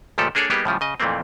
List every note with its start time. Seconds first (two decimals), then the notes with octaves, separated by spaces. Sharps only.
0.18 C#2 A#2 F3 A3 G4 A4
0.35 A#3 D4 G#4 A4 C#5 D5
0.50 G3 A#3 B3 D#4 G4 G#4
0.65 A2 C#3 F3 G3
0.81 C#3 D#5
1.00 F2 A#2 E3 A3 A#3 C4